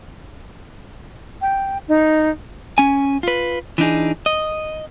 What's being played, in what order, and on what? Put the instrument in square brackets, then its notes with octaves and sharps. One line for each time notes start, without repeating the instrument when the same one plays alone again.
[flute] G5
D#4
[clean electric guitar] C#4 G#5
F4 B4
E3 D4 D#4 G#4
D#5